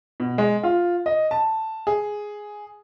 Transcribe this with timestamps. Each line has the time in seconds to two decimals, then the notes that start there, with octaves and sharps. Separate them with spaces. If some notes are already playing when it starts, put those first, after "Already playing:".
0.20 B2
0.38 G#3
0.63 F4
1.06 D#5
1.31 A5
1.87 G#4